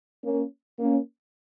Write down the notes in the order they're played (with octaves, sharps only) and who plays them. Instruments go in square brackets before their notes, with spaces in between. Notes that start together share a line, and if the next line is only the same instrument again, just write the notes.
[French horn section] A#3 C#4
A#3 C#4